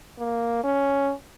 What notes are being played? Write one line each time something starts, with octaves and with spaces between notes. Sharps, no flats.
A#3
C#4